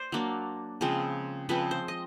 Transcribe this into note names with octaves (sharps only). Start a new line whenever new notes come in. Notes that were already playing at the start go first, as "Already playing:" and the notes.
Already playing: C5 D5
F#3 A#3 D4
C#3 F3 G#3 C4
C#3 F3 G#3 C4 B4
C5
D#5